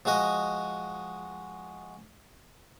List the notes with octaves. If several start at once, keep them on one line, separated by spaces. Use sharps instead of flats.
F3 G#3 F#4 D#5